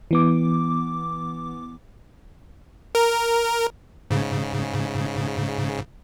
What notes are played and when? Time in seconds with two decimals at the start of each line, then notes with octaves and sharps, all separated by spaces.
0.11 E3 B3 D6
2.95 A#4
4.11 G#2 C#3